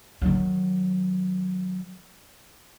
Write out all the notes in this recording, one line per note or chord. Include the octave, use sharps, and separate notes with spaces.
D#3 F#3